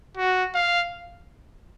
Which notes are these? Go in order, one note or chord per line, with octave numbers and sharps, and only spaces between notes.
F#4
F5